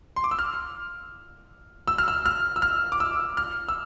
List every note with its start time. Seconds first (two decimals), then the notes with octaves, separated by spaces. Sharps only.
0.16 C6
0.24 D6
0.31 E6
0.39 F6
1.88 E6
1.98 F6
2.08 E6
2.26 F6
2.56 E6
2.62 F6
2.92 D6
3.00 E6
3.37 F6
3.69 E6